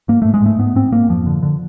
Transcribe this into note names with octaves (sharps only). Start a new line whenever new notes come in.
G#2 A#3
G#2 A3
G#3
G#2 A3
G#2 B3
G#2 C4
G#2 A#3
F2 F3
D3
D3